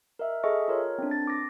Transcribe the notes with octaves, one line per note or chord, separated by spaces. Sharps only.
A#4 D#5 E5
G#4 A4 D#5 E5 C#6
F4 A#4 C#5
C4 D4
A6
D6 A#6